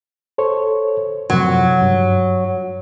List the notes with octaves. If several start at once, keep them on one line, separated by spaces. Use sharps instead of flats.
A4 C5 C#5
F#2 C3 F3 F#3
G2